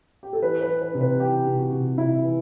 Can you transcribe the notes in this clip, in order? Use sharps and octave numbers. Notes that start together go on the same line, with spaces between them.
G4
A4
E3 B4
B4
E3
B4
C3
B4
E3 G4
C3
F#4
C3
C3 E4
E3